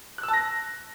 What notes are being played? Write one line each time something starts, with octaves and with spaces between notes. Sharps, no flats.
F#6
E6
A5
A#6